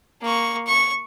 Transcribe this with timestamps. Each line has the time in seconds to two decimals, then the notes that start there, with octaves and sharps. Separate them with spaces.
0.22 A#3 C#6
0.67 C#6